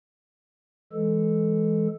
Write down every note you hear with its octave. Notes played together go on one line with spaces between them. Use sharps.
E3 G#3 A4